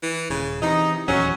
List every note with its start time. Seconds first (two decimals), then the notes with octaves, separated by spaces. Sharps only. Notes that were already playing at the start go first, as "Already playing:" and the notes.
0.03 E3
0.30 D#1 C#3
0.62 C3 E3 D#4
1.08 D#1 E2 F#3 C#4